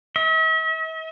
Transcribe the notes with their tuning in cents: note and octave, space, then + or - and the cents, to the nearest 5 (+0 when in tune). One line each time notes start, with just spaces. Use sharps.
E5 -45